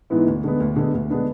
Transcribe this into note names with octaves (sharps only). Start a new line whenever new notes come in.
G#2 E3 B3 E4
D2
D3 G#3 B3
D2
D3 G#3 B3
D2
D3 G#3 B3 D4